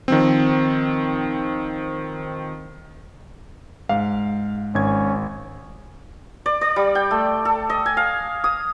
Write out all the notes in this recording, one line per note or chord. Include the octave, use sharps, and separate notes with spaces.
D#3 F3 C4
G#2 F5
G#1 C#4 G#6
D5
D5
G3
G5
A3
A4
D#5
G#5
F5
D#6